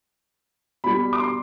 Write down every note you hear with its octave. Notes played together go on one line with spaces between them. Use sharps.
B2 G3 B5
D6
C6